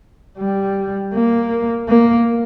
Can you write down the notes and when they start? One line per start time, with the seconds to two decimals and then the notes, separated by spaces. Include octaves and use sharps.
0.39 G3
1.14 A#3
1.89 A#3